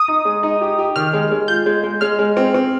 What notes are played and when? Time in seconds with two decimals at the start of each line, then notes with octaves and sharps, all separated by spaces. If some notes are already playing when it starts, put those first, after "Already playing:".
Already playing: D#6
0.08 D#4
0.25 G#3
0.43 D#4
0.61 G4
0.79 G4
0.96 D#3 F6
1.13 G#3
1.31 G#3
1.48 F4 G6
1.66 G#3
1.84 G#3
2.01 G#3 F6
2.19 G#3
2.37 C4
2.54 C4